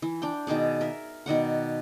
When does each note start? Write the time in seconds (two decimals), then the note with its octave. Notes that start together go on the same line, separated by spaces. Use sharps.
0.02 E3
0.22 D4 D5 G5
0.47 B2 D#3 G#4 D5
0.81 A#4 E5
1.26 B2 D#3 D5 F#5